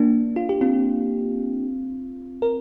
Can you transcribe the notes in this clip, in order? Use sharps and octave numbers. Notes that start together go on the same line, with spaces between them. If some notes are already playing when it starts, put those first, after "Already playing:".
Already playing: A#3 D4
F4
G4
C4 F4
A#4